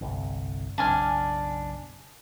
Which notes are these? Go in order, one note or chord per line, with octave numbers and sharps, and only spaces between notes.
G1 C2
F#1 B1 D4 G#5 F6